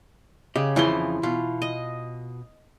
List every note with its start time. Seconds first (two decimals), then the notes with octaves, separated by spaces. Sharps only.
0.56 C#3 G4 D#5
0.76 F2 C#3 E3 F3 C6
1.23 B2 F4
1.62 D#5